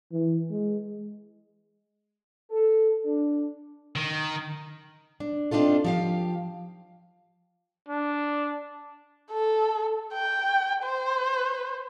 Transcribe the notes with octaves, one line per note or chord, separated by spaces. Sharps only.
E3
G#3
A4
D4
D#3
D4
C4 D4 D#4 F4 A4
F3 G4 F5
D4
A4
G5
C5